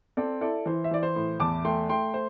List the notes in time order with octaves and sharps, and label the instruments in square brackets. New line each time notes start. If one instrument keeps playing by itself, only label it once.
[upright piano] C4 A4 D5
E4 A4 D5
E3 C5
E5
E3 D5
C5
A2
E2 A5 D6
A3 G5 C6
A3 G5 C6
C5